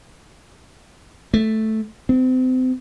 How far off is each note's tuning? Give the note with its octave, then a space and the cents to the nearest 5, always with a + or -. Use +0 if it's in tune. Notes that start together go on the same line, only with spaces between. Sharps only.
A3 -5
C4 -35